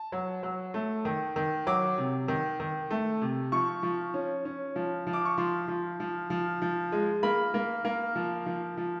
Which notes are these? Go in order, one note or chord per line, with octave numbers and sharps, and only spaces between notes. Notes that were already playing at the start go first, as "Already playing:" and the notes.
Already playing: A5
F#3
F#3
A3
D#3
D#3
F#3 D6
C3
D#3
D#3
A3
C3
F3 C#6
F3
C#4
C#4
F3
F3
D6
C#6
F3 C6
F3
F3
F3
F3
G#3
A#3 B5
A#3
A#3
F3
F3
F3